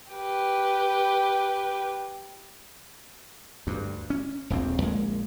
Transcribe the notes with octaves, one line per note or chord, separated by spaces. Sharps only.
G4 B4
D2 G2
C#4
D#1 A#1 D#2 C4
A#1 G#3 A#3